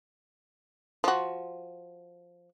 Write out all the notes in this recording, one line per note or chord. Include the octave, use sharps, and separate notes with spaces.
F3 F#4